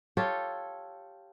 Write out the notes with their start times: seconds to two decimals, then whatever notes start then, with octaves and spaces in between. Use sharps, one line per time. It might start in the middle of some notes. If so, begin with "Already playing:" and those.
0.17 F4 G4 A4 C#5